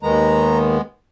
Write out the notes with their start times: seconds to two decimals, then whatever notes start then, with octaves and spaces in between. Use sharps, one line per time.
0.03 D#2 D#3 G#3 B3 A#5